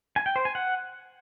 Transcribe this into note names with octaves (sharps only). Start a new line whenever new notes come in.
G#5
G5
C5
G#5
F#5